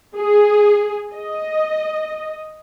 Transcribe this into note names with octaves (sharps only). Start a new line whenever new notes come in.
G#4
D#5